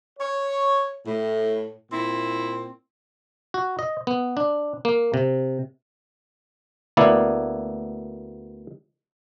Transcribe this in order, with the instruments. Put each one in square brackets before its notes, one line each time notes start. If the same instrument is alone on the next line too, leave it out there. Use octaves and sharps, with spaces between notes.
[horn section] C#5
A2
A#2 C4 E4
[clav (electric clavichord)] F#4
D#5
B3
D4
A#3
C3
D2 A#3 B3 E4 D5